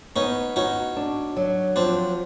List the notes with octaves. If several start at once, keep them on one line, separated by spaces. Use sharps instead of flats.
B3 C#4 D#4
C#4 D#4 F#4
D4
F#3
F3 C4 D4